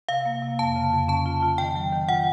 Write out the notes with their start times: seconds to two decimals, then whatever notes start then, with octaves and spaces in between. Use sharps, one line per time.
0.09 C3 F5
0.25 A#3
0.42 C3
0.59 F2 A5
0.76 C#3
0.93 F2
1.08 C#4 A5
1.26 F4
1.43 F4
1.58 D#3 G5
1.75 F#3
1.92 D#3
2.09 F4 F#5